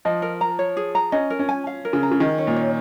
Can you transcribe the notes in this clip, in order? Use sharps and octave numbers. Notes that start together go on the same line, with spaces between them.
F3 D#5
A#4
A#5
C#5
G#4
A#5
C#4 D#5
A#4
C#4
G#5
F5
A#4
C#3
A#5
C#3
D#3 G#4
C#4
A#2
C#5